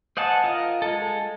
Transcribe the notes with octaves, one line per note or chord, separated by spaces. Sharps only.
C5 D#5 F#5 G#5 A5
F4 A#4 D#5
G#3 A4